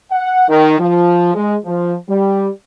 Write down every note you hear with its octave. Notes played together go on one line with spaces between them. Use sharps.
F#5
D#3
F3
G#3
F3
G3